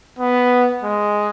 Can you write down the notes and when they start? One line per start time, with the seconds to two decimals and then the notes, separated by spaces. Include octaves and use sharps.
0.19 B3
0.84 G#3